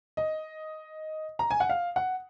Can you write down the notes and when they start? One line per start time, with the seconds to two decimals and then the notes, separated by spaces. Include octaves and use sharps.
0.17 D#5
1.39 A#5
1.51 G#5
1.60 F#5
1.69 F5
1.96 F#5